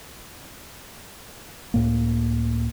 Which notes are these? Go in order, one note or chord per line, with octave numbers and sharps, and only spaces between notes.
C#2 A2 A#3